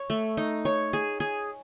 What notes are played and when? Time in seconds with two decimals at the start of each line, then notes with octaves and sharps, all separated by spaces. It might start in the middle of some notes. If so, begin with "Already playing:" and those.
Already playing: C#5
0.10 A3
0.37 D#4
0.65 C#5
0.93 G#4
1.20 G#4